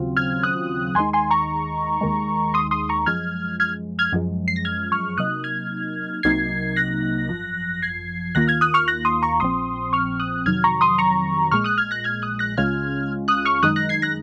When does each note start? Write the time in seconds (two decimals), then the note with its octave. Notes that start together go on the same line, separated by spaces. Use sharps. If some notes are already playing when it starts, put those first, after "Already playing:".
Already playing: D#2 C#3 F#3 C4 F4
0.17 F6 G#6
0.43 D#6 F#6
0.95 D#2 D#3 G#3 D#4 G#5 C6
1.13 G#5 C6
1.31 A#5 C#6
2.01 D#2 D#3 G#3
2.54 C6 D#6
2.71 C6 D#6
2.89 A#5 C#6
3.06 F#2 F3 G#3 F6 G#6
3.60 F6 G#6
3.99 F6 G#6
4.12 F#2 F3 G#3
4.48 C7
4.56 A#6
4.65 F6 G#6
4.92 C#6 F6
5.18 C3 F#3 A#3 D#4 D#6 F#6
5.44 F6 G#6
6.23 C2 C3 F#3 A#3 D#4 G#6 C7
6.76 F#6 A#6
7.29 G#1 F#2 F3
7.82 G#6 C7
8.35 D#2 D#3 A#3 F4 F#6 A#6
8.48 F6 G#6
8.61 D#6 F#6
8.74 C#6 F6
8.88 F#6 A#6
9.05 C6 D#6
9.22 A#5 C#6
9.40 A#1 A#2 F3 C4 C6 D#6
9.93 C#6 F6
10.20 D#6 F#6
10.46 F2 C3 D#3 F#3 F6 G#6
10.64 A#5 C#6
10.81 C6 D#6
10.98 A#5 C#6
11.51 A#1 A#2 G#3 C#6 F6
11.64 D#6 F#6
11.78 F6 G#6
11.91 F#6 A#6
12.04 F6 G#6
12.22 D#6 F#6
12.39 F#6 A#6
12.57 C#2 C#3 G#3 C#4 F4 F6 G#6
13.28 D#6 F#6
13.45 C#6 F6
13.63 F#2 D#3 G#3 D#4 D#6 F#6
13.76 F#6 A#6
13.89 G#6 C7
14.02 F#6 A#6